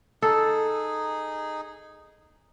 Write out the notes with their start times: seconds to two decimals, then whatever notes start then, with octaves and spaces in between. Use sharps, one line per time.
0.22 D#4 G#4 A4